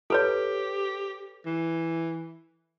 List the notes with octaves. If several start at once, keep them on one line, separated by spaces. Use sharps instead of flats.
G4 A4 B4 C#5
E3